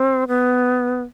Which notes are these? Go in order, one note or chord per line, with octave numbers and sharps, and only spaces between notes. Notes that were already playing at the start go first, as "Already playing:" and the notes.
Already playing: C4
B3